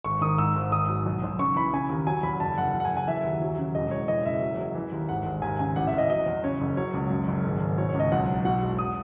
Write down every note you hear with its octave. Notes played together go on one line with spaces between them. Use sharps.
G#1 C#6
D#3 D#6
G#2 E6
G#1
G#1 D#6
F#3
B1
B1
C#3 C#6
E3 B5
C#3 G#5
D#2
F#3 G#5
E2 B5
F#1 A5
F#1 F#5
F#1
F#5
G#5
F#1
G#5
E3 E5
D#2
F#3
C#3
E1 D#5
E1 C#5
E3 D#5
F#1 E5
F#3
F#3
E3
D#2
G#1 F#5
G#1
D#2 G#5
C#3 G#5
A1 F#5
E5
A1 D#5
F#3 D#5
E2
C#3 C#5
F#1
F#3 C#5
C#2
F#2
F#1
G#1
G#1
B2 C#5
C#5
C#2
D#5
B1 F#5
F#3
B2 F#5
E1
D#6